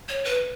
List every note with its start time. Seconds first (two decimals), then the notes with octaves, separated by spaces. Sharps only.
0.09 C#5
0.25 B4